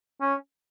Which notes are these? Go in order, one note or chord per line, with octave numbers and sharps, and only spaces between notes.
C#4